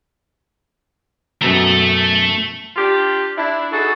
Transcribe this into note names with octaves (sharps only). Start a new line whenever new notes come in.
F#2 B2 A3 A4 A#5
D4 F4 G4
D4 E4
D#4 F#4 G#4 A4